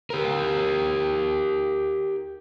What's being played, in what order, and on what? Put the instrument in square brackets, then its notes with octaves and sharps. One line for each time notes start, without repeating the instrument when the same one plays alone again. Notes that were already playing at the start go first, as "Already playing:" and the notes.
[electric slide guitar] G4 A#4